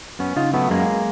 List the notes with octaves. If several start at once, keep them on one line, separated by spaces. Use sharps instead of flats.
F#2 B3 C#4
C#3 D#4 F4
F#3 A3 B3
F#2 G#3 A#3